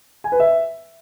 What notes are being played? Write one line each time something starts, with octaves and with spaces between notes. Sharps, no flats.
G#5
B4
E5